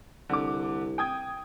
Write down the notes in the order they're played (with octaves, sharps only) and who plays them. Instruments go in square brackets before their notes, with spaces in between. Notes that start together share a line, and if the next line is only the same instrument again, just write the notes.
[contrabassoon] C2 [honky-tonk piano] D3 D6
[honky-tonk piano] G5 D#6 G#6